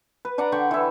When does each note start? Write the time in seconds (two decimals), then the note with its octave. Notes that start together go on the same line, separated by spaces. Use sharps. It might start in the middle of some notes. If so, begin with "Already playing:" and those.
0.25 B4
0.38 D4 D5 F#5 A#5
0.52 D3 G5 B5 C#6
0.71 E3 E4